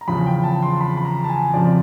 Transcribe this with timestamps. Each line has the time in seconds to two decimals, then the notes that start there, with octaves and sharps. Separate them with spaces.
0.01 A#5
0.08 E2 C#3 F3 B5
0.26 G5
0.44 A5
0.62 C6
0.81 B5
0.97 B5
1.04 A#5
1.24 A5
1.29 G#5
1.54 F2 C#3 F3 D5